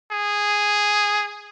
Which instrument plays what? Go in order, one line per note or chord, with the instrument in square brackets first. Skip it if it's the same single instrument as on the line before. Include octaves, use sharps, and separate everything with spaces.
[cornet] G#4